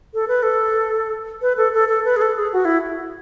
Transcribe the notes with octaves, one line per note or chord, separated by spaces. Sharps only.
A4
B4
A4
B4
A4
A4
A4
B4
G#4
A4
G#4
F#4
E4